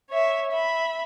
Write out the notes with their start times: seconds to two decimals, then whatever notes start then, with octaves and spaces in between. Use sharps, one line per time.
0.10 C#5 E5
0.52 E5 B5